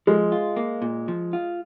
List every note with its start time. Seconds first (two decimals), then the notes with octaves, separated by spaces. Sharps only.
0.07 F3 G#3
0.32 F4
0.56 A#3
0.82 A#2
1.08 F3
1.33 F4